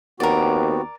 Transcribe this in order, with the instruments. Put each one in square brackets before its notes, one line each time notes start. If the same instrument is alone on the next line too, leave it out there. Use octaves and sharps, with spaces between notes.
[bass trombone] D#2 [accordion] B3 C4 F#4 [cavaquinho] A#4 D5